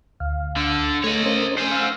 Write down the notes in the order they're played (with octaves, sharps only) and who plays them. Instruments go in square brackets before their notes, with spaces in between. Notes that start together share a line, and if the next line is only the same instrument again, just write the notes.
[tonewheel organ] D2 F5
[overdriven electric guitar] D3
[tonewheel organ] A3 [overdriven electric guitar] C#5 D#5
[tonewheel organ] C#4 A#4 C5
[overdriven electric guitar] C5 G#5
[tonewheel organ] F5 E6